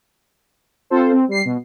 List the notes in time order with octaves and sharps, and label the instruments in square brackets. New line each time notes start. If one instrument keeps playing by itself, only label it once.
[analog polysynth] C4 F4 A4 C5
C4
G3 C7
B2